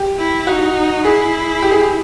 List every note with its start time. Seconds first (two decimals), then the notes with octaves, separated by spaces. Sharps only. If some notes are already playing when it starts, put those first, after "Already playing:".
Already playing: G4
0.19 E4
0.47 D#4 F#4
1.05 E4 G#4
1.62 G4
1.71 G#4
1.80 G4